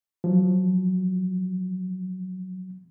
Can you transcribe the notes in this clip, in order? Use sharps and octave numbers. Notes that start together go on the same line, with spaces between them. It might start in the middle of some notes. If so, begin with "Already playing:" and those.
F3 F#3